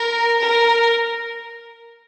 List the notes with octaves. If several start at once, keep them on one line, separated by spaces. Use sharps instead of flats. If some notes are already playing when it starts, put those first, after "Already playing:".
Already playing: A#4
A#4